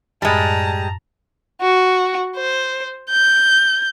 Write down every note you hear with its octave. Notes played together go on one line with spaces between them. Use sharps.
F#2 A2 G3 G#3 A5 A#5
F#4
C5
G6